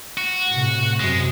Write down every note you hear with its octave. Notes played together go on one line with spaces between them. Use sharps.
F#4
A2 C3
F#2 C3 G#3